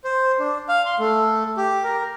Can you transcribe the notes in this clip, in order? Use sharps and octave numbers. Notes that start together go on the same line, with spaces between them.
C5
D4
F5
C6
A3
G4
A#4